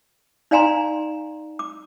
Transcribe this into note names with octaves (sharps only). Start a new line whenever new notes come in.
D#4 D5 F5 G#5 A#5 C6
D6